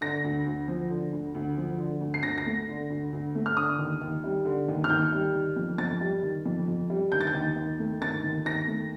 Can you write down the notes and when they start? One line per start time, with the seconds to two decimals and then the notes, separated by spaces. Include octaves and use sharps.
0.01 D3 A#6
0.24 D2
0.46 D2
0.68 F3
0.90 D3
1.13 D2
1.35 D2
1.57 F3
1.78 D3
2.01 D2
2.14 C7
2.23 D2 A#6
2.38 A#6
2.46 A3
2.68 D3
2.90 D2
3.13 D2
3.35 A3
3.46 F6
3.57 D3 D#6
3.79 D#2
4.01 D#2
4.24 G3
4.45 D3
4.68 D#2
4.84 F6
4.90 D#2 G6
5.12 G3
5.34 D#3
5.56 F2
5.78 F2 A6
6.01 G3
6.23 D#3
6.46 F2
6.68 F2
6.90 G3
7.12 D#3 G6
7.21 A6
7.27 G6
7.34 D#2
7.56 D#2
7.79 A3
8.01 D#3 A6
8.24 D#2
8.45 D#2 A#6
8.67 A3